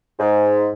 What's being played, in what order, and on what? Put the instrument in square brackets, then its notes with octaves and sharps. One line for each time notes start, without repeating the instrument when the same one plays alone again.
[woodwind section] G#2